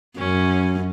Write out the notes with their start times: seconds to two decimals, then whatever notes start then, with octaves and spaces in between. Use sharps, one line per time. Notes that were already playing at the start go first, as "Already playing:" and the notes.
0.18 F#2 C#4